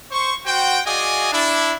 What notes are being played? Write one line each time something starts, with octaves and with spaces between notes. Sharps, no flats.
C5 C#6
F#4 C5 F#5 G5
F#4 G#4 D5 D#5 F5 G#5
D4 E4